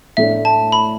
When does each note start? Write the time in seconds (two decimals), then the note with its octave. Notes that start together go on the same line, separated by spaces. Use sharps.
0.17 A2 A3 D4 E5
0.45 A5
0.72 B5